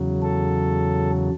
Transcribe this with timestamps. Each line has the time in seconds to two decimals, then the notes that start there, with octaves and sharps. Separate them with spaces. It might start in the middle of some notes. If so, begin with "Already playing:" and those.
Already playing: E2 C#3 F#3
0.22 A4